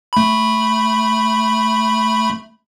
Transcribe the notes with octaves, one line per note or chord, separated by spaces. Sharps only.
A3 B5